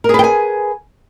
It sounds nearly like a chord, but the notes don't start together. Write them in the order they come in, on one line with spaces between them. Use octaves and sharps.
A#4 G#4 B4 G5 G#5